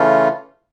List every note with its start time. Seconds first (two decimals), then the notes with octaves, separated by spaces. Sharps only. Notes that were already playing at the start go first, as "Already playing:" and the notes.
Already playing: C#3 E3 A3 C#4 F4